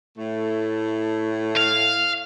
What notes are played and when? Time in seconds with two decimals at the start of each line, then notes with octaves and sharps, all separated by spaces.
0.18 A2 A3
1.57 F5